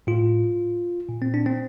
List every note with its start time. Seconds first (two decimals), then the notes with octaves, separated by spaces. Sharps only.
0.07 A2 F4
1.09 A#2
1.22 C4
1.34 D4
1.46 C4